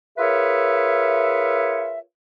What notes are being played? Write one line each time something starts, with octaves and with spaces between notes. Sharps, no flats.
F4 G#4 A#4 B4 C#5 E5